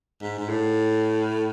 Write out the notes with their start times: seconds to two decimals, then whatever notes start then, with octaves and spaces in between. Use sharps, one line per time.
0.22 G#2
0.38 G#2
0.49 A2